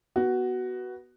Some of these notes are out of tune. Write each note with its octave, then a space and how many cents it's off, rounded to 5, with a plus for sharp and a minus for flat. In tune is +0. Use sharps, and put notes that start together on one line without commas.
B3 -10 F#4 +10